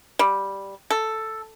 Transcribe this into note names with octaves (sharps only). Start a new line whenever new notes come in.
G3
A4